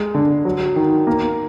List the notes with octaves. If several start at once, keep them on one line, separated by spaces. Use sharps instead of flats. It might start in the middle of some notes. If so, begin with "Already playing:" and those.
Already playing: G#3
D3
F#3
D#3
A#3